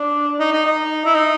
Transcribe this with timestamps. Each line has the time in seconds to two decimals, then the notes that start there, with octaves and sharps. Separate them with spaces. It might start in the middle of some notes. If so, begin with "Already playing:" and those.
Already playing: D4
0.40 D#4
0.52 D#4
0.65 D#4
1.06 E4
1.15 D#4